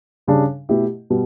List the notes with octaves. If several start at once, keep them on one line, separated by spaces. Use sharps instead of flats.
C#3 G3 D4
B2 A3 E4 G4
B2 G3